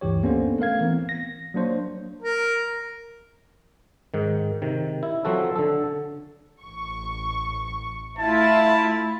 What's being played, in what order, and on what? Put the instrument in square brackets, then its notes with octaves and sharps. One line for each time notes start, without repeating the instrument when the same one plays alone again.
[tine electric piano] D2 G2 E3 G4 C#5
A#3 B3 C#4 D4 A4 C5
A3 A#4 F5 G#6
E3 B3 C4
A#6
F#3 A#3 D4 C5 C#5
[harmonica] A#4
[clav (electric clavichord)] G#2 D#3
C3 D#3
E4
F3 F#3 C4 F#4 A4
D3 A4
[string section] A1 C#6
[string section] A3 E4 F4 [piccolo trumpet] A5